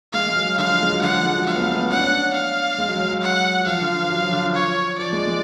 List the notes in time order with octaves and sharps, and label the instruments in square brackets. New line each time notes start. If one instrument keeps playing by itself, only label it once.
[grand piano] G#3 [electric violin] F5
[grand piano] G#3
F#3
[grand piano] D3 [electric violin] F5
[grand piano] F3
G#3
F#3
[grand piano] D3 [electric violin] F#5
[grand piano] F3
G#3
F#3
[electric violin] F5
[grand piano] B3
A3
A3
B3
[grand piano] C#4 [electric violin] F#5
[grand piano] D4
C#4
[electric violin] F5
[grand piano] G#3
F#3
F#3
F#3
[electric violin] F#5
[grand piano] F#3
[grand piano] F3 [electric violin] F5
[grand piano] D3
F3
F#3
F3
D3
F3
[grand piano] F3 [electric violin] C#5
[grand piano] F3 [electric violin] D5
[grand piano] G#3
G#3